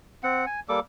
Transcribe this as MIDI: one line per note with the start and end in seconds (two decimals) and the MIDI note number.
0.23 0.45 60
0.23 0.45 78
0.46 0.60 80
0.69 0.80 55
0.69 0.80 58
0.69 0.80 69
0.69 0.80 86